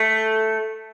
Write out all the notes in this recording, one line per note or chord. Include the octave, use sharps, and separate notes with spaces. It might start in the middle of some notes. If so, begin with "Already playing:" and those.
Already playing: A3